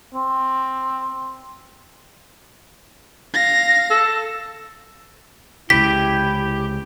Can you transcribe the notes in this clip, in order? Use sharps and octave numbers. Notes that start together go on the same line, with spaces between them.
C4
F5 A#6
A4
C#2 C3 E4 G4 B6